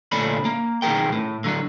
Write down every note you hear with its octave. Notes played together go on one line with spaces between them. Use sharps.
D2 A#2 A3 C#4 D4 B5
A#3
B1 D#3 C#4 G#4 A#4 G5
A2
D3 F#3 D4